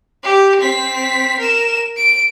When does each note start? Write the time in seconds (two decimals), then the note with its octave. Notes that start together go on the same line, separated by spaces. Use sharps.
0.24 G4
0.60 C4 B6
1.39 A#4 E7
1.97 D7